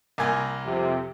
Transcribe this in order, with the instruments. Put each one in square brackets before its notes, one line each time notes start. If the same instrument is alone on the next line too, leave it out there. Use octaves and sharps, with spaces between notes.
[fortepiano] C2 A#3 G#5
[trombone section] F2 C3